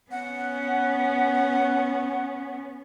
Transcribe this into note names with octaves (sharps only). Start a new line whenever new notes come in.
B3 C#4 F#5